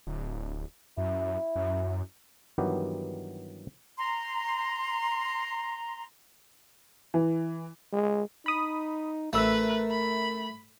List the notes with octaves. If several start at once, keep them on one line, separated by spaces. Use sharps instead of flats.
D1
F#2 E4
F#2
G2 D#3 E3 F#3 B3 G4
A#5 C6
E3
G#3
D#4 B5 D#6
A1 A3 A#4 B4 E5
B5